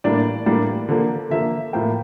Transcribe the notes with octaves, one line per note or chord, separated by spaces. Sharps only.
A2 E3 G3 A#3 D4 D5
A2 E3 G3 A#3 D4
D3 F3 A#3
D3 F3 A#3 E5
A2 F3 A#3 G5